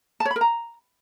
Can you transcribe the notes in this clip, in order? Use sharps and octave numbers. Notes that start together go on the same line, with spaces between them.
A5
C#5
B5
A#4
A#5